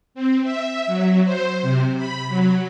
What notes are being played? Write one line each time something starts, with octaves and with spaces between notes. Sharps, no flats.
C4
E5
F#3
C5
C3
B5
F#3